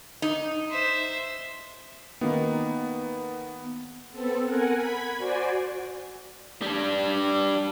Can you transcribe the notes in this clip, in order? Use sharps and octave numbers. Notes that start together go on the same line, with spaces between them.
D#4
C5 E5
D#3 A#3 B3
B3 C4 A4
A#4 F#5 G#5
B5 G#6 B6
F#4 C5 D5 G#5
G3 D4